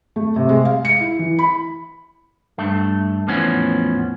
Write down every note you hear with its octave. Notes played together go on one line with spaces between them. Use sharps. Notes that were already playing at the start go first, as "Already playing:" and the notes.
A3
C3
G#3
F5
C#7
E4
E3
B5
G2 A3
E2 A2 F3 B3 C#4